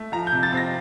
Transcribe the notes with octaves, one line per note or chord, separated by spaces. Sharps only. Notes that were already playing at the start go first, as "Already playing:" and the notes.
Already playing: A3
F3 A#5
G6
C3
A6
C4 A#6